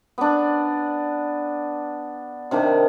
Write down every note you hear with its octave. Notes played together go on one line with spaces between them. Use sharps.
B3 D4
C3 D#3 D4